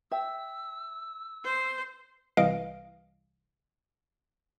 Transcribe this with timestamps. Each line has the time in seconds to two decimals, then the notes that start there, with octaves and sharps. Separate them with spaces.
0.11 E5 G5 E6
1.44 C5
2.37 C2 E3 D#5 F5 D7